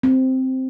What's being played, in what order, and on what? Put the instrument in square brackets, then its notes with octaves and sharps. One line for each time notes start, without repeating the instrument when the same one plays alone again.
[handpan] C4